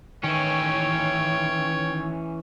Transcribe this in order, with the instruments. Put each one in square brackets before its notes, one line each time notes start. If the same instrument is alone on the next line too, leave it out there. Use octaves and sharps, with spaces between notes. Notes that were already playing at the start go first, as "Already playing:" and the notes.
[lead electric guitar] D#3 [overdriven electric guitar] E3 C#4 [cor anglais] C#5 [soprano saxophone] G5